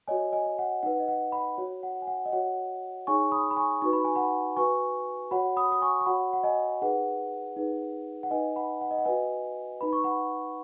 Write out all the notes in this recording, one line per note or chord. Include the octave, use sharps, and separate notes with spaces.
F#4 C#5 D#5 G#5
D#5 G#5
G#5
F#5
D#4 B4 F#5
D#5
F#5
F#5 B5
F#4 C#5
F#5
G#5
F#5
D#5
F#4 C#5 F#5
D#4 G#4 C#5 G#5 C#6
B5 D#6
B5
G#5 C#6
D#4 F#4 B4 C#6
B5
G#5
F#5 B5
F#4 B4 G#5 C#6
F#4 C#5 F#5 B5
B5 D#6
D#6
G#5 C#6
C#6
F#4 C#5 F#5 B5
F#5
D#5 G#5
D#4 G#4 B4 F#5
D#4 G#4 B4
F#5
D#4 B4 D#5 G#5
F#5 B5
F#5
D#5
F#5
F#4 B4 D#5 G#5
D#4 B4 B5
C#6
F#5 B5